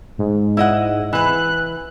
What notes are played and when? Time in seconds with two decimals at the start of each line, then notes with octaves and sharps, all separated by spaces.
0.18 G#2
0.57 E4 D#5 F#5
1.13 E3 B4 F#6